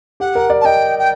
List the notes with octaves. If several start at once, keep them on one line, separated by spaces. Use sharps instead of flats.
G4 F#5
A#4
D5
A5
D#5 G5
G5